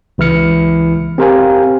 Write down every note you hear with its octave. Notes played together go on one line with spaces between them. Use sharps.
C#2 E3 E4 F6 C#7
C4 G4 A#4 C5 F5 G#5